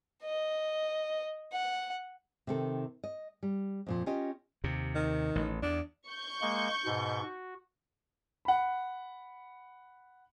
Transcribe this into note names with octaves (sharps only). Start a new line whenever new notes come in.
D#5
F#5
C3 D#3 A4
D#5
G3
F2 A#2 F3
C#4 F4 G4 D#5
D#2 C3
D#3
A1
E2 D4
C#6 G6
G#3 A#3
G#2 B2
F#4
F#5 B5